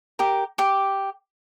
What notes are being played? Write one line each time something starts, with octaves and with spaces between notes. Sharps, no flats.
G4 A#4
G4 D6